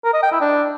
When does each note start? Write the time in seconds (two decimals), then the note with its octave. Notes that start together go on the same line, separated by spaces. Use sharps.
0.04 A#4
0.14 D#5
0.23 G5
0.32 E4
0.41 D4